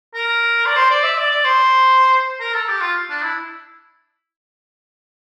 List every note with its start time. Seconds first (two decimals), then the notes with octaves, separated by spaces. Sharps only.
0.14 A#4
0.66 D5
0.76 C5
0.90 D5
1.03 E5
1.18 D5
1.31 D5
1.44 C5
2.40 A#4
2.54 A4
2.68 G4
2.81 F4
3.10 D4
3.22 E4